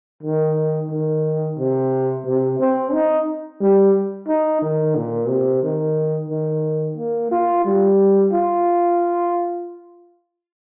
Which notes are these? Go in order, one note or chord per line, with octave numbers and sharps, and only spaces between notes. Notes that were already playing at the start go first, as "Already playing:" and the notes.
D#3
D#3
C3
C3
C4
D#4
G3
D#4
D#3
A#2
C3
D#3
D#3
A#3
F4
G3
F4